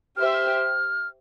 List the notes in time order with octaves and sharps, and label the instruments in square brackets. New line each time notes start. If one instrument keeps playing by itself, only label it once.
[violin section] G4 C5 E5 [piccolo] F6
[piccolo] E6
F6